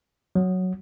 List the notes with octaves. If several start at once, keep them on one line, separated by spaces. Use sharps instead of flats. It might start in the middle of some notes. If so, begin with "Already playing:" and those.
F#3